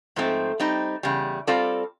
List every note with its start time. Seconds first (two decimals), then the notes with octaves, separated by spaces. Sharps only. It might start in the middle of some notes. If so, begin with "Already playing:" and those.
0.16 G#2 F3 A3 C4
0.60 G3 C4 D#4
1.03 E2 C#3 G3
1.47 G3 C4 F4 A4 D5